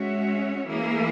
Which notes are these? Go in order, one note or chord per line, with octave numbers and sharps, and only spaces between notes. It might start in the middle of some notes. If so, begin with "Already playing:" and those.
Already playing: G#3 C#4 F#4 C#5 E5
E3 A#3 E4 G#4